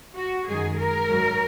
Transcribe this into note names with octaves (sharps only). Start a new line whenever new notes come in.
F#4
F#2 D#3 G#3 G#4
A#4
G#2 F#3